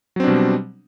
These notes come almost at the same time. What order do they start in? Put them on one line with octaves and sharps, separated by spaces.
F#3 C4 D4 B2 G3